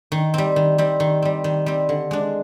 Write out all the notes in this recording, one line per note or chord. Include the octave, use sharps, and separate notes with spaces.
D#3
G3 C4
D#3
G3 C4
D#3
G3 C4
D#3
G3 C4
D3
G#3 D4